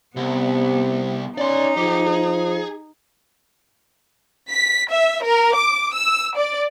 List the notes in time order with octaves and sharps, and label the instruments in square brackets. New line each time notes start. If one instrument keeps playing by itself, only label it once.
[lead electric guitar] C2 [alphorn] C3 [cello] B3
[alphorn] C#4 [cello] D#4 [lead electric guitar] D5 C6
[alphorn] F3 [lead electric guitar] G4 G#4
[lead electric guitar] G#4
[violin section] B6
E5
A#4
D6
E6
D5